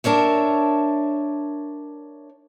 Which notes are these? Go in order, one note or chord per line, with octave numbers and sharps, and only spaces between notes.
D4 A#4 C#5 E5